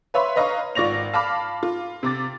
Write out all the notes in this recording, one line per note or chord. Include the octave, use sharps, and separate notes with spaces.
B4 C#5 E5 B5 C6
B4 C#5 D#5 F5 A#5 C#6
G#1 F4 D5 C#6 A#6 F7
F5 A5 B5 D6 F6
F4
C3 D6 A6